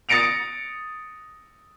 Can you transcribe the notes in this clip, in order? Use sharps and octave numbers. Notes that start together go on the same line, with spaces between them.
D#6 A6 A#6 C#7 D7 F7